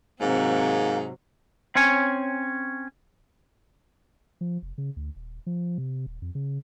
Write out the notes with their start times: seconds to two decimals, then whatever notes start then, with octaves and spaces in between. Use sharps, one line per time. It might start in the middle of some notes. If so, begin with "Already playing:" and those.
0.21 G#2 C3 F#3 A#3 C4
1.75 C4 C#4 C#5 G#5
4.41 F3
4.62 F1
4.78 C#3
4.96 D2
5.16 D#1
5.46 F3
5.78 C3
6.06 D#1
6.22 F2
6.35 C#3